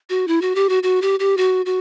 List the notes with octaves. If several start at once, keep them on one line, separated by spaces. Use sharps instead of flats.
F#4
E4
F#4
G4
F#4
F#4
G4
G4
F#4
F#4